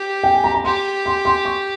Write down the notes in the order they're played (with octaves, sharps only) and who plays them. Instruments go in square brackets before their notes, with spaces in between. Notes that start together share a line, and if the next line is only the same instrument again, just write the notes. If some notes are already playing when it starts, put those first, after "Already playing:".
Already playing: [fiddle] G4
[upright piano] G5
G#5
A#5
A#5
[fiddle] G4 [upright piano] C6
[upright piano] C6
C6
C#6